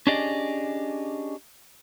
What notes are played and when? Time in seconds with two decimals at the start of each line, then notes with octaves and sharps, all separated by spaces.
0.07 C#4 D4 G4 G#4 D5 D#5